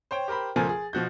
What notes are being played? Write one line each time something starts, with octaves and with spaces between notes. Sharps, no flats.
C5 C#5 G5
G4 A#4 C5 B5
C#2 F3 A3 A#4 G#5 A6
G#4
B2 F3 F#4 G6